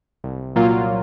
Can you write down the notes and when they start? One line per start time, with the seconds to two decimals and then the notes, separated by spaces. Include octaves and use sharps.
0.24 C2
0.56 A#2 F#3 A#3 F4